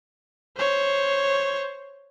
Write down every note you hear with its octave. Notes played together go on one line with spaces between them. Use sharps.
C5 C#5